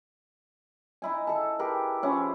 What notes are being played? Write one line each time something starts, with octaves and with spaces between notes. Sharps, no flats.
D#4 E4 G#5
A4 A5
G4 G#4 A#4 B4
F3 C#4 E4